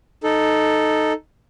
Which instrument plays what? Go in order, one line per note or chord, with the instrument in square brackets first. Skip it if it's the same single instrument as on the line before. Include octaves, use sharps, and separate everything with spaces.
[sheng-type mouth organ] D#4 A4